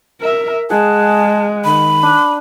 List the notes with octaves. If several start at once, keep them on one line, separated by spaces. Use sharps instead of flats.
A#4 E5
G#3 G#4 F#5 A5
D#3 B5
D4